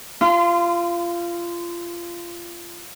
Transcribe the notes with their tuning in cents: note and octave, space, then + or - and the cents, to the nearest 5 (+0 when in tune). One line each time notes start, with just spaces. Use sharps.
F4 -20 C6 -40